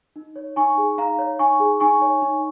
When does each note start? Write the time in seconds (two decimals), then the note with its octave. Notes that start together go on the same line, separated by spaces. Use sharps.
0.16 D#4
0.36 C#5
0.56 D#4 G#5 C#6
0.78 G#4
0.98 D#4 F5 A#5
1.19 C#5
1.39 D#4 G#5 C#6
1.60 G#4
1.80 D#4 G#5 C#6
2.01 C#5
2.22 D#4